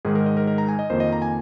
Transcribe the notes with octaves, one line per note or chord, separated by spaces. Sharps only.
G#2 D#3 G#3 G#4
A#4
D#5
A#4
A#4
A#5
G#5
D#5
F2 D#3 A#3 C5
D#5
A#5
G#5